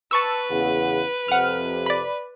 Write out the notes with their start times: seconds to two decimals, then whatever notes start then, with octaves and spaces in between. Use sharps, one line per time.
0.11 B4 A5 C#6 E6
0.51 E2 C#3 F#5
1.28 F2 C3 F#5 F6
1.86 D5 B5